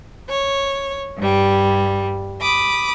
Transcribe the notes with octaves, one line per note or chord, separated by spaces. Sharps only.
C#5
G2 G3
B5 D6 D#6